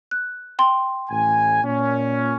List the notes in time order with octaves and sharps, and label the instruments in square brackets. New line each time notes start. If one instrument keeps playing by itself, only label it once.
[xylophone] F#6
G5 C6
[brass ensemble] A1 A2 G#5
A#2 C#4